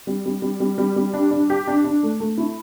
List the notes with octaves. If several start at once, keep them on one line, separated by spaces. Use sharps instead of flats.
G3
G3
G3
G3
G3
G3
D4
D4
G4
D4
D4
A3
A3
E4